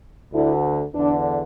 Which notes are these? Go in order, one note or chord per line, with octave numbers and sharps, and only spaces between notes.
D2 D3 E4
E2 D3 D4